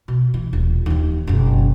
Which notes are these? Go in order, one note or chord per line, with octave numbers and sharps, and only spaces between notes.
B2
E3
D#1
D#2 F3
F#1 B2